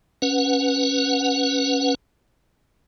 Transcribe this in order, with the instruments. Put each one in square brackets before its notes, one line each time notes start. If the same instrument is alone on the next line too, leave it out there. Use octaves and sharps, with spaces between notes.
[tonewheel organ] C#4 B4 F#5